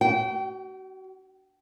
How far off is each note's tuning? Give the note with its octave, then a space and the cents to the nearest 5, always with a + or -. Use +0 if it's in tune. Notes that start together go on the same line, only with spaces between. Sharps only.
F#4 +35 G5 -25